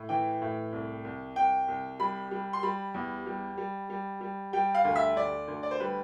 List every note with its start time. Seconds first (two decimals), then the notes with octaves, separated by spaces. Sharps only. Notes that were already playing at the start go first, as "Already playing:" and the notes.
Already playing: A2
0.09 E3 G5
0.42 A2
0.72 C2
1.05 C2
1.36 C2 G5
1.68 C2
2.00 G3 B5
2.31 G3
2.53 C6
2.63 G3 B5
2.94 E2
3.26 G3
3.58 G3
3.90 G3
4.21 G3
4.53 G3 G5
4.75 F5
4.85 D2
4.96 E5
5.16 D2 D5
5.48 D2
5.63 D5
5.71 C5
5.80 G3 B4